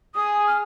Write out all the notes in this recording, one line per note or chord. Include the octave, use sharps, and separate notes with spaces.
G#4 D#6
F6